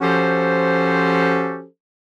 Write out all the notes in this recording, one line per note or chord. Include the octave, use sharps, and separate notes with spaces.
F3 C#4 F#4 G4 A4 C5